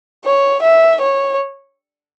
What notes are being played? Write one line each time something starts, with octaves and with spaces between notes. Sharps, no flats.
C#5
E5
C#5